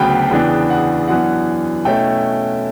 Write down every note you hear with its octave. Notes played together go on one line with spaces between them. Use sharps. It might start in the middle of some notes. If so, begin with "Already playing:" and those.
Already playing: D2 C#3 F#3 B3 G5 A5 B5
E2 C#3 E3 B3 D4
F#5
F#2 E3 B3 D4 F#5
B2 A3 C#4 E4 G5